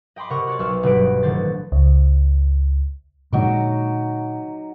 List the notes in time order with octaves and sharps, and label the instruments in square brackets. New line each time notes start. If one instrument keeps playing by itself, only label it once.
[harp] D#5 G5 B5 C6 D6
C3 A#4 F#5 C#6
F#4 C#5 D5
B1 C#6 E6 F6
G1 B2 F#3 B4 D7
A1 D3 D#3 C5 A6
[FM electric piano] C#2
[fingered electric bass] A#2 D3 G#3 [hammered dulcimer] F#3 D#4 D6